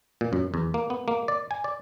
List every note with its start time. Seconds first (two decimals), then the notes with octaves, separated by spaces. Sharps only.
0.21 A#2
0.33 F#2
0.54 E2
0.74 A#3
0.90 B3
1.08 A#3
1.28 D5
1.51 G#5
1.64 D5